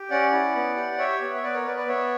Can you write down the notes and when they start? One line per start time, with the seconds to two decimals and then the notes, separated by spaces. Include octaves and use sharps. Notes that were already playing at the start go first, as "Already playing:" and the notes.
Already playing: G4
0.10 C#4 D5 F#5
0.32 E4
0.55 B3
0.77 G4
0.98 G4 C#5 E5
1.21 B3
1.35 E5
1.43 B3 B4 D5
1.54 A#4 C#5
1.65 B3 B4 D5
1.77 B4 D5
1.88 B3 C#5 E5